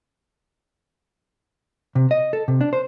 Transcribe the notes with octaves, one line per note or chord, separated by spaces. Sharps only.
C3
D#5
A4
C3
D4
C5